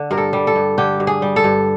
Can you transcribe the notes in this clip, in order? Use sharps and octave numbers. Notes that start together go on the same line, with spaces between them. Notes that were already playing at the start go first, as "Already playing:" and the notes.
Already playing: D3
G2 A#4
A4
G3
A4
G2
D3 G4
G2
G#4
G3
A4
G2